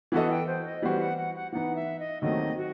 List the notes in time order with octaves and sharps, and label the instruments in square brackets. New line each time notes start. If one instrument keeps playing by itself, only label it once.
[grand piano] E3 B3 F#4 A4 D#5 [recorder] F#5
[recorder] G5
C5
D#5
[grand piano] E3 G3 B3 F#4 C5
[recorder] F#5
F#5
F#5
[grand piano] E3 B3 D#4 [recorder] F#5
[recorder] E5
D#5
[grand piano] D#2 D#3 F#3 A3 C4 [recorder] D#5
[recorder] F#4